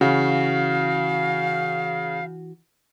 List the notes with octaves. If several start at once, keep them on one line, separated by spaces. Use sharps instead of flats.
C#3 E3 F#4 F5